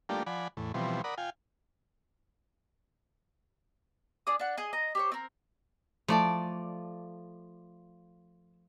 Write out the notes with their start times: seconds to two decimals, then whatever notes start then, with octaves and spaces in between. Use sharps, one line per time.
0.09 G3 A3 A#3 D4 F4 G4
0.26 F3 D5 F#5 G#5 B5
0.57 E2 A2
0.74 B2 E3 F3 G3 C4
1.04 A#4 D5 F#5 B5 D#6
1.18 F4 F5 G5 G#5
4.27 D4 G#4 D5 D#6
4.39 D4 F#5
4.57 G#4 D#5
4.73 D#5 A#5
4.95 G4 C5 C#5
5.12 C4 A#4
6.08 F3 A3 E4 D5 A5